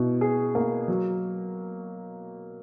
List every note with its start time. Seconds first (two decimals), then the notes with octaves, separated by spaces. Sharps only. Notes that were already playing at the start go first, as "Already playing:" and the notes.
Already playing: B2 E4
0.21 G#4
0.55 A#3
0.88 F#3